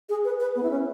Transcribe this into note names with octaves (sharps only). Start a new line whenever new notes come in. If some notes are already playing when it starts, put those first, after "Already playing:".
G#4
B4
B4
B3
E4
C#4